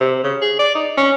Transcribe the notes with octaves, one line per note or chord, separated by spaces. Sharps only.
C3
C#3
G#4
D5
D#4
C#4